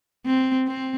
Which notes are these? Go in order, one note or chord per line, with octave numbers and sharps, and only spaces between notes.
C4
C4